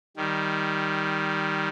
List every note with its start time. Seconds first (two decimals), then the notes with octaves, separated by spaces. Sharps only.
0.17 D#3 G3